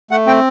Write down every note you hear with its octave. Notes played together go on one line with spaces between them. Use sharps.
A3 F#5
C4 G5